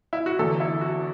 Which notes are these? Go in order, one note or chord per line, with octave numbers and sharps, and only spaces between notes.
E4
F#4
E2 D3 F#3 A4
E4
F#4